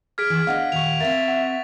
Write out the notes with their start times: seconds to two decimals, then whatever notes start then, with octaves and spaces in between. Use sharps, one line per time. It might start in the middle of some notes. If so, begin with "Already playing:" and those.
0.18 G#4 F6 G#6 B6 D7
0.30 E2 E3
0.47 B3 D4 D#5 F5 F#5
0.72 D#2 A#2 C#6 F7
1.00 C4 A#4 E5 A6
1.28 F#5